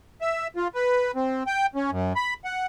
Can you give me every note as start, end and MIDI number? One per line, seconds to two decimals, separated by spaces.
0.21 0.47 76
0.56 0.68 65
0.75 1.11 71
1.15 1.43 60
1.47 1.66 79
1.75 1.91 61
1.91 2.13 42
2.16 2.34 83
2.45 2.66 78